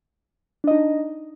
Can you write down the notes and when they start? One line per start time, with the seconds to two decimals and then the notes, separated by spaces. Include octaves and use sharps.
0.64 D4
0.67 D#5
0.71 D#4